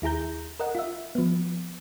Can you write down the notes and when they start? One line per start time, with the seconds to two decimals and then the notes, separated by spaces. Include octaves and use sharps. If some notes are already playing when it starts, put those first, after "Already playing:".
0.02 D#2 E4 G#4 A#5 G6
0.60 A#4 D#5 F#5
0.75 F4 E5
1.15 F3 B3